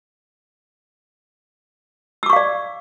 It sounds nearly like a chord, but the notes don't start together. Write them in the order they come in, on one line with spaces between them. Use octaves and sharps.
E6 D6 C#6 F5 D5